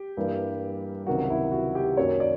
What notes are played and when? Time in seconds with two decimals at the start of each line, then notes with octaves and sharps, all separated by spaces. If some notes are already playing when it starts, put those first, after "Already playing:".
Already playing: G4
0.17 G2 E3 G3 A#3
1.07 C#2 C3 D#3 F#3 F#4
1.30 E4
1.52 F#4
1.75 G4
1.97 F#2 D#3 F#3 A#3 C#5
2.20 D5